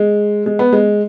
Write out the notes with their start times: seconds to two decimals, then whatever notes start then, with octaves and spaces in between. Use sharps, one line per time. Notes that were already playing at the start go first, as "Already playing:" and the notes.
Already playing: G#3
0.46 G#3
0.59 B3
0.73 G#3